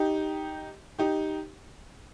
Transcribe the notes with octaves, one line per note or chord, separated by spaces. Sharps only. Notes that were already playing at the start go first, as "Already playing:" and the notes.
Already playing: D#4 G4
D#4 G4